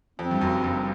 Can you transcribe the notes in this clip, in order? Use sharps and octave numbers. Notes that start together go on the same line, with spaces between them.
F2 C4
G2
F#1 F#2
F#1 F#2